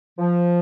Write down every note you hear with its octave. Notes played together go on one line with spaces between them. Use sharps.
F3